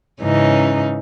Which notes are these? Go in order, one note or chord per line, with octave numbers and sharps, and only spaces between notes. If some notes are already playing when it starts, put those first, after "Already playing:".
G#2 C#3 E3 C#4 D#4